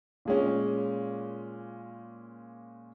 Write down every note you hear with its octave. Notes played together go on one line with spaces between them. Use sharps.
A#2 G#3 C#4